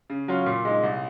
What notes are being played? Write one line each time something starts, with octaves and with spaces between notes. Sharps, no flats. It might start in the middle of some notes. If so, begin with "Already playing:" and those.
C#3
F#3 C#4 F4
A#2
G#3 D#4
C2